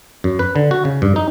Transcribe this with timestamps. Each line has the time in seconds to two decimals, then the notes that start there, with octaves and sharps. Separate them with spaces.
0.24 F#2
0.39 B4
0.56 D3
0.71 F#4
0.85 C#3
1.02 G2
1.16 D#4